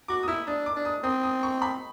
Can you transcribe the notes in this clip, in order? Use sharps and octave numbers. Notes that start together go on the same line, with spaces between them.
F#4 D6
D#6
E4 E6
D4 D#6
D6
D4
D#6
C4 D#6
D#6
C#6
B5